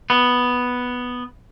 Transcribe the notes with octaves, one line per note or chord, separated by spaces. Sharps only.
B3